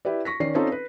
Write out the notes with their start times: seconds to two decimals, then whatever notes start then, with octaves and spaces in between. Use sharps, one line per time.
0.05 E4 G4 B4 D5
0.25 C#6 A#6 B6
0.40 D#3 C#4 D5 C7
0.55 C4 C#4 D#4 F4 A4 D5
0.72 B4